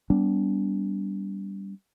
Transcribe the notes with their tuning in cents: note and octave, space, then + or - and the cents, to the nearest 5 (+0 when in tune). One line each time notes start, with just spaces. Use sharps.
G3 +0 B3 +0 D4 -30